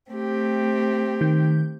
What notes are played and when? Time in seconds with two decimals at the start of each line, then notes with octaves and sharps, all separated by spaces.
0.10 A3 C4 G4
1.21 D#3 G6